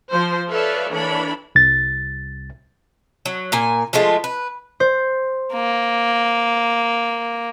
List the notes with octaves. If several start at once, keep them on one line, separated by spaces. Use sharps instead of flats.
F3 C5
A4 B4 C#5 D5 E5 F5
E3 A#3 D4 A4 C#5 B5
C2 A6
F#3
A#2 A#3 G#5
F3 G#3 A3 F4
B4
C5
A#3